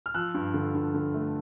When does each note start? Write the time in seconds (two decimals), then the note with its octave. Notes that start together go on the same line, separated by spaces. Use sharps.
0.06 F6
0.14 F3 E6 F#6
0.34 G2
0.54 D3
0.75 G2
0.94 D3
1.14 A3